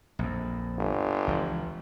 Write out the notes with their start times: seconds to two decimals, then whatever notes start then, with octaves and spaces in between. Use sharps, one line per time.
0.19 A#1 F2
0.78 G1
1.27 C#2 E3 F3